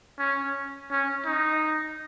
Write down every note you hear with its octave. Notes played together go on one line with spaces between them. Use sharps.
C#4
C#4
D#4